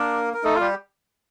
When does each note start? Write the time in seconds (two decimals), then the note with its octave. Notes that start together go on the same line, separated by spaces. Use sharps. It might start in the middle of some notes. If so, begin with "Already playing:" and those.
Already playing: A#3 D4 A#4
0.34 A#4
0.44 A3 D#4 A4
0.56 G3 F4 G4